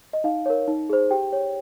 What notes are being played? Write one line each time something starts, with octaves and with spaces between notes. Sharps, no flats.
D#5
D#4 F5
A#4 C#5
D#4
G#4 C5
G4 G5
C#5